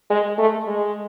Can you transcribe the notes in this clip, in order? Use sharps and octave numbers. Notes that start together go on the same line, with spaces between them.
G#3
A3
G#3